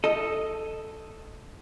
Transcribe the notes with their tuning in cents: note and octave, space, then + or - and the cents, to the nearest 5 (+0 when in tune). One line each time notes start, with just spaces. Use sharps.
A4 +0 D#5 +0